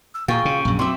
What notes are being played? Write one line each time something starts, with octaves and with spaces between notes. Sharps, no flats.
E6
A#2 F4 G#4 G5 A#5 C#6
C#3
A#1 F#2
F#3 C4 E5 C6 D6